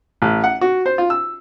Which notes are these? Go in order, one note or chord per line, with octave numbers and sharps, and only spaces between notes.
A1
F#5
F#4
C5
F4
E6